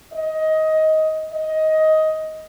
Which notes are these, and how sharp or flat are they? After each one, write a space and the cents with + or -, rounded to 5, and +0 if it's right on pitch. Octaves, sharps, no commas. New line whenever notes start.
D#5 +15
D#5 +15